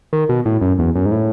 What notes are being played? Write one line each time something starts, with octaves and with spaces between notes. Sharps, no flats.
D#3
B2
A2
F#2
E2
F#2
G#2
A2